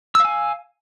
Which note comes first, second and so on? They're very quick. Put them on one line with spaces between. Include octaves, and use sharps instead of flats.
E6 F5 G#5